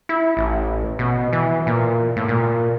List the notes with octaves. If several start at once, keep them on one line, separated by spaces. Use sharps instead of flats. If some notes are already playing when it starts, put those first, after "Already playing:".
E4
A1
B2
E3
A#2
A2
A#2